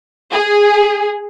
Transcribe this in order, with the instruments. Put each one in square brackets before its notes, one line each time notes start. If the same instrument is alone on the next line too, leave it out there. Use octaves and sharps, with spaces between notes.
[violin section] G#4